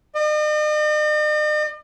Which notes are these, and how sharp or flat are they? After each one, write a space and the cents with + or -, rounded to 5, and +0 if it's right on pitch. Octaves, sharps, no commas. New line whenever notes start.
D#5 -45